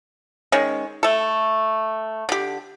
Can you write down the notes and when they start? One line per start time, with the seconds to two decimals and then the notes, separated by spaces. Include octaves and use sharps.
0.52 D#3 G#3 C#4
1.03 A3 A4
2.29 D3 G4